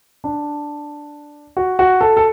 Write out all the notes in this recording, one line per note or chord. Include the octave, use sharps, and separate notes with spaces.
D4
F#4
F#4
A4
A4